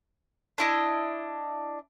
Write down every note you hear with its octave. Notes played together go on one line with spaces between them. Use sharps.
D4 E4 D#5